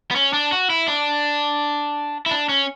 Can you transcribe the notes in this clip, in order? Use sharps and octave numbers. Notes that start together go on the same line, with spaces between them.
B3
C#4
D4
F#4
E4
D4
E4
D4
C#4